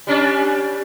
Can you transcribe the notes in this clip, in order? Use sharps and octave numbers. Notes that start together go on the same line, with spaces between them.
G3 C#4 D4